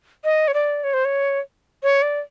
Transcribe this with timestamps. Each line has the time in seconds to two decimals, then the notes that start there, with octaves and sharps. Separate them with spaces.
0.24 D#5
0.48 C#5
0.54 D5
0.84 C#5
0.94 C5
1.05 C#5
1.83 C#5
2.02 D5